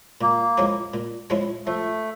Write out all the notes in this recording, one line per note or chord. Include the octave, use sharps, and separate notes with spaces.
A#2 A#3
F3 G#3 C#4 E4
A#2
F3 G#3 C#4 E4
F3 A3